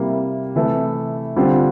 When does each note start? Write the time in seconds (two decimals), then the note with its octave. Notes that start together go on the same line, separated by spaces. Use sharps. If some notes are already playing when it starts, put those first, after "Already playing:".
Already playing: C3 G3 A#3 E4
0.56 C3 E3 A3 E4
1.36 D3 G3 C4 F4